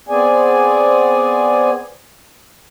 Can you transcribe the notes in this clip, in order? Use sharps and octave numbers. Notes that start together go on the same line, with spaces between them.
B3 C4 G#4 D5 G#5